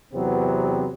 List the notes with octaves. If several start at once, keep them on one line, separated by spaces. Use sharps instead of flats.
E2 C3 F#3 B3 C4